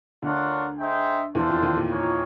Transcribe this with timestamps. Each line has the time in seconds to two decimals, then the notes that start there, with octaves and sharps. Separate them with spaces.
0.22 D2 D3 D4 F4 A#4 C#5 F#5
0.78 D#4 G#4 C5 E5 G5
1.35 E2 E3 D4 F4 A4 C5
1.49 F2 F3
1.63 D#2 D#3
1.77 A#2
1.90 A#3 D#4 G#4 C#5